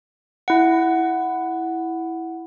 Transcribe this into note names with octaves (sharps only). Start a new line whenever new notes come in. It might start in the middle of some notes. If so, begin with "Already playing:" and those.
E4 F#5